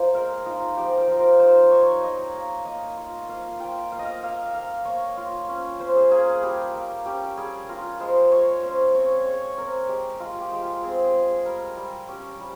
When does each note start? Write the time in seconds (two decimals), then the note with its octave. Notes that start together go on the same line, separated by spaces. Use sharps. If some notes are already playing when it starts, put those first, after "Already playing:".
Already playing: A#3 F4 C5
0.14 G#3 A#4
0.46 D#4 F4
0.77 F3 G4
0.98 A#4
1.08 F3 C5
1.19 A#4
1.39 D#4 C5
1.71 D#4 C#5
2.02 A#3 D#5
2.34 A#3
2.65 A#3 D#5
2.97 F4
3.29 A#3 F5
3.60 F4 G5
3.92 A#3 F5
3.99 D#5
4.05 F5
4.23 A#3 F5
4.54 A#3 F5
4.85 A#3 C#5
5.17 F4
5.49 C#4
5.80 C#4 C5
5.96 G#4
6.11 A#3 G#4
6.28 G#4
6.43 G3 G4
6.74 A#3
7.06 C#4 G4
7.37 G3 G#4
7.69 F4 A#4
8.00 G#3 C5
8.31 G#3 C#5
8.63 C#4 C5
8.95 C4 C#5
9.26 G#3 C#5
9.58 C4 A#4
9.89 G#3 G4
10.20 G#3 F4
10.41 G4
10.52 G#3 G4
10.62 F4
10.83 C4 G#4
11.04 G#4
11.15 G#3
11.26 G#4
11.45 G3 A#4
11.77 G3
12.08 C#4 G4
12.40 G3